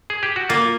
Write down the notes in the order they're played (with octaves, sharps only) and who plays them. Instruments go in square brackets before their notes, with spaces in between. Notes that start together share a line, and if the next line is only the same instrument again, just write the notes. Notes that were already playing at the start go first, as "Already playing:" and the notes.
[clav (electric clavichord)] G#4
G4
F#4
[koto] A#3 [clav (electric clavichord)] F4